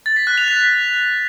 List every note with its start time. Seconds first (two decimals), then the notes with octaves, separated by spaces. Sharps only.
0.06 A6
0.16 B6
0.27 F#6
0.38 F7
0.48 B6